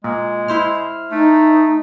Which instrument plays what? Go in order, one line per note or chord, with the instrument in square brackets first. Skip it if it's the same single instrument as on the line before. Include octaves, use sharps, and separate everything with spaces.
[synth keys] A#2 [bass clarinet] G#3
[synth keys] E4 C5 F6
[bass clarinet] A3 [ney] D#4